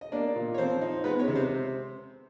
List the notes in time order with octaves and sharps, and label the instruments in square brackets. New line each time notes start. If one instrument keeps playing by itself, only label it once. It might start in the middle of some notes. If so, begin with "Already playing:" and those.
[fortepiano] D#5
A#3 D4 D5
A#2
C#5
F3 C4 C5
D#4
G#3 B3 B4
C#4 C#5
C3
C4 C5